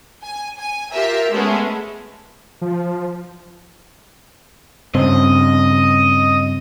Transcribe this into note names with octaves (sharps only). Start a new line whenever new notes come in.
G#5
G#5
F4 G4 A#4 E5
G#3 A3 B3 C#4
F3
G2 C#3 C4 D#5